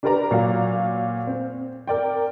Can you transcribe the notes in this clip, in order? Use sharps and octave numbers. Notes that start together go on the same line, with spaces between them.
D4 G4 A#4 B4 D5 A#5
A#2 F#3 F#4 F5
C4
A#4 D5 G5